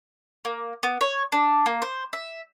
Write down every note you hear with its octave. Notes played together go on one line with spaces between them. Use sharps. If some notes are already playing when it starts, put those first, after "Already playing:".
A#3
B3
C#5
D4
A#3
C5
E5